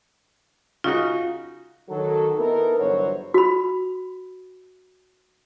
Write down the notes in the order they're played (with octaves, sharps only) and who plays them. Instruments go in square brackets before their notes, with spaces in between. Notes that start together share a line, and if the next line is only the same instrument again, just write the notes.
[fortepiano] C#3 D#4 F#4 [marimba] F4
[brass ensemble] D#3 F#3 A4
B3 D#4 E4 A4 A#4
G1 E3 F#3 F#4 C5 C#5
[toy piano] F#4 B5